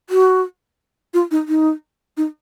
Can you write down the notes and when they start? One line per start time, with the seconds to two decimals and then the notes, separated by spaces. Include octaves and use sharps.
0.10 F#4
1.14 F4
1.31 D#4
1.48 D#4
2.17 D#4